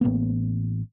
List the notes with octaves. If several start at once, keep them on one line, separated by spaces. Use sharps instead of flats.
A1 F#3 A#3 B3